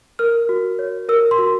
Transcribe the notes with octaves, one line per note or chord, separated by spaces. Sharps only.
A#4 F6
F#4
C#5
A#4 E6
C6
F#4